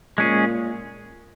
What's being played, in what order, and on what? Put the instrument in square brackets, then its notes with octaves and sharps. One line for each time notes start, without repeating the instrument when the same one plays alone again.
[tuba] A#2 [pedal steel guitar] G#3 C#4 G#4